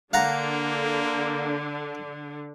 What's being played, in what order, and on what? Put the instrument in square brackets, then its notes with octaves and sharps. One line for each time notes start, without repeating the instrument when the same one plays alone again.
[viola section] D3 [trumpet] A#3 [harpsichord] F5 F#5 A#5